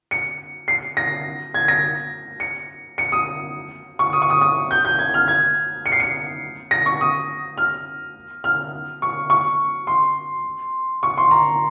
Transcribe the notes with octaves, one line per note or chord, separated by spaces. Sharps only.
C#7
C7
A#6
G#6
A#6
C#7
C#7
D#6
C#6
D#6
C#6
D#6
D#6
G6
G6
G#6
F6
G#6
C#7
C7
C#7
A#6
C#6
D#6
F6
F6
C#6
C#6
C6
C#6
C6
A#5